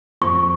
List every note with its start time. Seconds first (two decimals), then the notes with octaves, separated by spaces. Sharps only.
0.21 F2 C#6